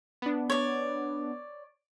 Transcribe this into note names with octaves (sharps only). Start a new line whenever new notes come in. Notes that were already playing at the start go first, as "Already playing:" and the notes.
B3 D4
C#5 D5